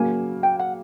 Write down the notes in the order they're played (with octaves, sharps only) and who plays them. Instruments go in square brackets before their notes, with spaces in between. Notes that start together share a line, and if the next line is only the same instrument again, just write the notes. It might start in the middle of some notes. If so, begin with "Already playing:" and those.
Already playing: [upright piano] C#3 F#3 A#3 [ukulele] G#5
[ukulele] G5
F#5